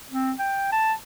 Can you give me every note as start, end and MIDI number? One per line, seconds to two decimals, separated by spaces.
0.11 0.33 60
0.39 0.69 79
0.72 0.93 81